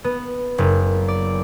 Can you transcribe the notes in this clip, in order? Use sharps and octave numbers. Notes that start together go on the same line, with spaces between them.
B3
F#1
D5